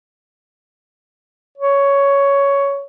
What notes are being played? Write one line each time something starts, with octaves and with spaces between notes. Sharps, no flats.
C#5